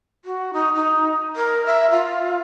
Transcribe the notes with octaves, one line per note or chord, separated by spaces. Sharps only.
F#4
D#4
D#4
A#4
E5
F4